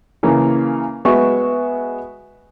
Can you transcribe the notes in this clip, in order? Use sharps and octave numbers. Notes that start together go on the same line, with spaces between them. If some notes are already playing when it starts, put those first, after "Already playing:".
C#3 E3 A#3
G#3 B3 F#4 E5 C#6